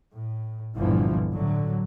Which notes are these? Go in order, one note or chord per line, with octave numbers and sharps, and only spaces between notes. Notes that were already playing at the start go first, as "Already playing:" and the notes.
A2
G1 C2 A#2 D3 E3 F3
A2 D3 F#3